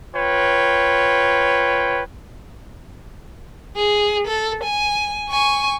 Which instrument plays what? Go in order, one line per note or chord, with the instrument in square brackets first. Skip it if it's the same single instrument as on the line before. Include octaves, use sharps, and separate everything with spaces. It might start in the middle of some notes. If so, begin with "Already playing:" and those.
[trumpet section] F4 B4 C#5 G5
[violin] G#4
A4
G#5
G#5 C#6